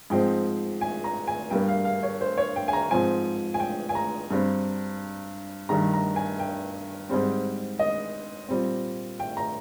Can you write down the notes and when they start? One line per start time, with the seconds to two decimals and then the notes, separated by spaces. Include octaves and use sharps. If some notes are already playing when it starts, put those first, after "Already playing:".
0.10 G#2 F3 G#3 C4 G5
0.81 G#5
1.04 A#5
1.27 G#5
1.50 G2 G3 A#3 G5
1.68 F5
1.85 F5
2.03 C#5
2.21 C5
2.38 C#5
2.56 G5
2.68 G#5
2.73 A#5
2.90 G#2 F3 C4 G#5
3.54 G#5
3.60 G5
3.89 G#5
3.95 A#5
4.31 G2 G3 C4
5.69 G2 D#3 G3 A#5
5.94 A#5
6.16 G#5
6.40 G5
7.09 G#2 G3 C4
7.79 D#5
8.48 A#2 G3 C4
9.20 G5
9.37 A#5